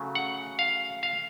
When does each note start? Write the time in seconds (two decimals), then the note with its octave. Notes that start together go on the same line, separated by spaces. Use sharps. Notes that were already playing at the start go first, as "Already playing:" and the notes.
Already playing: C#3 F#3 A3
0.15 F#5
0.59 F5
1.03 F5